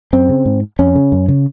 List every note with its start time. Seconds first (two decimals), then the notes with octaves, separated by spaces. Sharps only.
0.13 F#2 C4
0.29 C#3
0.45 G#2
0.79 F2 C#4
0.95 C#3
1.12 F#2
1.28 C#3